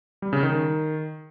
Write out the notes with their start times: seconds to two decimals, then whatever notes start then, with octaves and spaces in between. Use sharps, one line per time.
0.22 G3
0.33 C#3
0.43 D#3